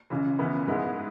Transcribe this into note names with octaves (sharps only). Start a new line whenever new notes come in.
C#2 C#3 E3
C#2 C#3 E3 B3 E4
G#2 G#3 B3 E4 G#4